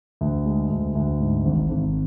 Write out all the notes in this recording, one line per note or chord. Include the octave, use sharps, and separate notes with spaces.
D2
G#3
D2
D2
G#2
G#1
G#1